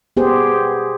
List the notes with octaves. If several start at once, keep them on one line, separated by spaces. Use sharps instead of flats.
B3 G4 G#4 C5